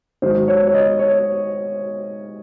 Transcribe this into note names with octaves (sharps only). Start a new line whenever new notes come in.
G#2 D#3 F#3 C5
C#5
C#5
D#5
C#5